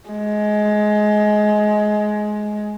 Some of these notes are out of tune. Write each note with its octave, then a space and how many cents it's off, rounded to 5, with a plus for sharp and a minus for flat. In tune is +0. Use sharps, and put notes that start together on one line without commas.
G#3 +20